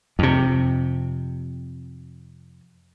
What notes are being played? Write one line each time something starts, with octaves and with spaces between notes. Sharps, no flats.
F2 C3